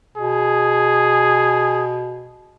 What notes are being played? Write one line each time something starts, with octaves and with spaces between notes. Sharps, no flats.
B2 G#4